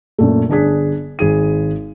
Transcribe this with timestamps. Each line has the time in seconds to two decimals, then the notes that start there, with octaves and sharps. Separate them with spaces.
0.19 F#2 A#2 A3
0.49 G1 D4 G#4 B6
1.19 G#1 G#4 D#7